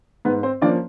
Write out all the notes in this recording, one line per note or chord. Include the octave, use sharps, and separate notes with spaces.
G#2 B3 B4
C4 C5
F3 A#3 C#4 D4 D5